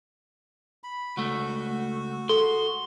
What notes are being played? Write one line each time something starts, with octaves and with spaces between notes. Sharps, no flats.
B5
C#2 A3 F#4
A4 C6